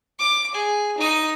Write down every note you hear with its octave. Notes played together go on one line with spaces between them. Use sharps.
D6
G#4
D#4 D#6